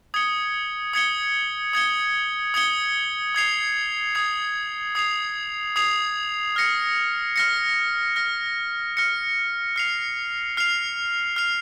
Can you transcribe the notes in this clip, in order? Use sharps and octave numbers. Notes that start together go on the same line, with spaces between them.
D#6 G#6 C#7 G7
D#6 G#6 C#7 G7
D#6 G#6 C#7 G7
D#6 G#6 C#7 G7
D#6 G#6 C7 F7
D#6 G#6 C7 F7
D#6 G#6 C7 F7
D#6 G#6 C7 F7
F6 A#6 C#7
F6 A#6 C#7
F6 A#6 C#7
F6 A#6 C#7
F6 C7 F7
F6 C7 F7
F6 C7 F7